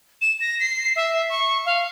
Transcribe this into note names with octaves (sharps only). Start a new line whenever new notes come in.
E7
A#6
C7
E5
C#6
F5